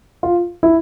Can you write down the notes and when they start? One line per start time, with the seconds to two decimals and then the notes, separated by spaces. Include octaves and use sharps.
0.23 F4
0.63 E4